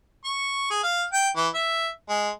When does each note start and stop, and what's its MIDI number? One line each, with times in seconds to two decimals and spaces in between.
0.25 0.66 85
0.71 0.83 68
0.84 1.04 77
1.13 1.29 79
1.37 1.48 52
1.55 1.89 76
2.09 2.29 56